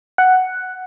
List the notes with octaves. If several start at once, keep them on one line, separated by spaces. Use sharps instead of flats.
F#5